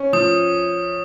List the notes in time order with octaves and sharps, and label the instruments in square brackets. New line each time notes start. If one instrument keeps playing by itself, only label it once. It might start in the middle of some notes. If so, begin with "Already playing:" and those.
Already playing: [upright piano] C#4
[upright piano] F3 [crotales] D#6